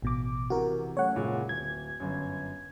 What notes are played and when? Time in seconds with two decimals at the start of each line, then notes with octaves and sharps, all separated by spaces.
0.02 A1 B2 D6
0.50 C3 E3 F#4 A#4
0.97 F#3 A3 C#4 C#5 F#5
1.16 F#1 A#2 G#3
1.49 D1 G#6
2.00 G1 F#2